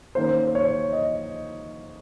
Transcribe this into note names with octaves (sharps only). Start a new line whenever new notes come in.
D#3 A#3 C#4 C5
C5
C#5
D#5